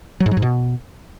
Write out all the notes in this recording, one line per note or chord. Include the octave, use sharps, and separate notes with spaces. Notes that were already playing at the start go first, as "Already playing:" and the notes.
F#3
G#2
F#3
G#2
B2